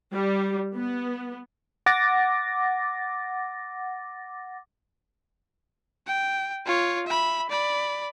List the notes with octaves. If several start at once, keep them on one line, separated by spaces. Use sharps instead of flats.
G3
B3
F#5 D6 A6 A#6
G5
F4 C#5
E5 B5
D5 B5